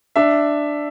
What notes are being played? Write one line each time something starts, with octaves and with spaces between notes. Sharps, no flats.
D4 E5